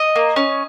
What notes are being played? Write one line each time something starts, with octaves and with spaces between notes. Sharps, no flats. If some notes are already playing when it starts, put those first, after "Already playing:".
Already playing: D#5
A#3
C#4